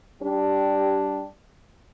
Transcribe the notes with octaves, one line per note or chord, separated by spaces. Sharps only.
G3 D4 G4